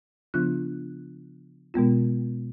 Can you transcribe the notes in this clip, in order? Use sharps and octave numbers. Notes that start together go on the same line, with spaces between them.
C#3 F3 B3 D4 F4 F#6
B2 G#3 B3 F4